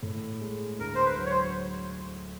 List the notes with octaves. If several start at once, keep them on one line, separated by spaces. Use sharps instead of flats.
A2
G#3
D2 A#4
C5
B4
F#3
C#5
C5